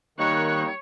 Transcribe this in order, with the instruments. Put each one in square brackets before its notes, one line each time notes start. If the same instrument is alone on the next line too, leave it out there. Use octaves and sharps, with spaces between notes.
[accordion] D#3 C#6 F#6 [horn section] G3 A#3 D#4 [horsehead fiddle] C#5